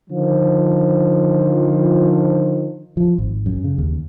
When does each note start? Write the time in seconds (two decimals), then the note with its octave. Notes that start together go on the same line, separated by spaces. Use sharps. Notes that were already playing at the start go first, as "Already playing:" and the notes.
0.10 D3 D#3 F3
2.97 F3
3.18 G#1
3.46 F#2
3.64 C#3
3.78 D#2